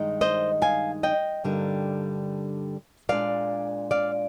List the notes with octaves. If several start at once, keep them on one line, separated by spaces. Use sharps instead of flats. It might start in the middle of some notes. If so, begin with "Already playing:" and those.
Already playing: G2 D#3 G#3 D#4
C5 D#5
F5 G#5
D#5 G5
G2 D3 G3 A#3 D#4
A#2 G#3 D4 D5 F5
D5 F5